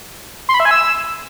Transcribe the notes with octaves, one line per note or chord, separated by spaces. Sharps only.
C6
B5
E5
G#5
E6